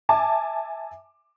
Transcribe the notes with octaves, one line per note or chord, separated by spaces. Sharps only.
E5 G#5 A5 D6